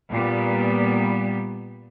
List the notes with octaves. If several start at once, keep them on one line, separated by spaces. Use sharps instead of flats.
A#2 G3 B3